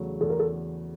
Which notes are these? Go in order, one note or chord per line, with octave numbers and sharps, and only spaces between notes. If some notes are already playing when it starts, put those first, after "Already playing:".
Already playing: E2 C#3 F#3 A3
E2 A4
A#4
A4